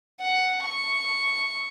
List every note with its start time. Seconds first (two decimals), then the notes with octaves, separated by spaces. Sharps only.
0.20 F#5
0.64 C#6